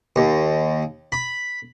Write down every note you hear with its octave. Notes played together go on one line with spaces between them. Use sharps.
D#2
B5